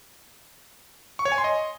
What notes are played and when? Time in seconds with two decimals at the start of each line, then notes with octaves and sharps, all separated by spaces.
1.19 C#6
1.25 C#5
1.32 G#5
1.38 C6
1.44 D#5